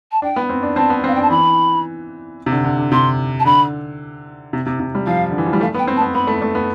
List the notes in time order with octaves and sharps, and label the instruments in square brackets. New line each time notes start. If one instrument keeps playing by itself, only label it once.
[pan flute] A5
[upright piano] D4 [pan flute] G5
[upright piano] B3
C4
D4
[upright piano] C4 [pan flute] A5
[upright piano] B3
C4
[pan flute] F5
G5
[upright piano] D4
[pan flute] A5
[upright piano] E3 [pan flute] B5
[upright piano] C3
D3
D3
D3
[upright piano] C3 [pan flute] C6
[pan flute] A5
[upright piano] D3 [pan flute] B5
[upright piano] C3
C3
C3
G3
[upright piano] F3 [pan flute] F5
[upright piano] D3
E3
F3
G3
[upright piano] A3 [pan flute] F5
[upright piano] B3
[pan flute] G5
[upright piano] C4
[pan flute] A5
[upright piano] B3
[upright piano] B3 [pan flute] B5
[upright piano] A3
A3
B3